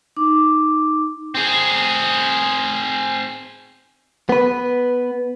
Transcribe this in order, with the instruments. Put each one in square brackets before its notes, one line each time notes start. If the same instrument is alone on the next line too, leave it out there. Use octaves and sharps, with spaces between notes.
[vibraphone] D#4 D6
[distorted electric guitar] C4 G#4
[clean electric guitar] B3 B4